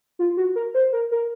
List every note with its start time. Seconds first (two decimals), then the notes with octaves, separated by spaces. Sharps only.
0.19 F4
0.37 F#4
0.56 A#4
0.74 C5
0.93 A#4
1.11 A#4